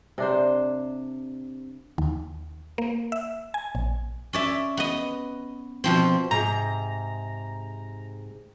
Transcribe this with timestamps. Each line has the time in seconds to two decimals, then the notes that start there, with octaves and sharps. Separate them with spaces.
0.18 C3 D4 C5
1.98 D#2
2.78 A#3
3.12 E5
3.54 G#5
3.75 A#1
4.33 C#4 D5 E5
4.77 B3 D#5
5.84 B2 F3 C4
6.31 G#2 C3 A#5